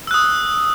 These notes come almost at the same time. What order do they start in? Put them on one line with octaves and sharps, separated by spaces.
E6 F#6 D#6